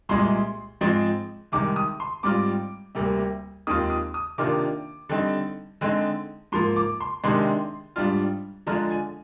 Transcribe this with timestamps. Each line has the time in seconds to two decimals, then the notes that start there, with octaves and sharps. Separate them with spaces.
0.09 C2 A#2 G#3 C6
0.81 G#2 F3 G#3 C4
1.52 C2 C3 D#3 G#3 D6
1.76 D#6
2.00 C6
2.23 G#2 G3 C4 F4 D6
2.95 D2 C3 G3 A#3
3.67 D#2 D#3 G#3 C4 F4 D#6
3.90 D#6
4.14 D#6
4.38 C3 D#3 A#3 D4 F4 D6
5.09 D3 G3 C4 D#4
5.81 D3 G#3 C4 D#4
6.52 G#2 F3 A#3 C6
6.76 D6
7.01 C6
7.24 C3 D#3 G#3 D4 C6
7.96 G#2 G3 D4 F4
8.67 D3 F3 G#3 D4 F4 A#5
8.91 G#5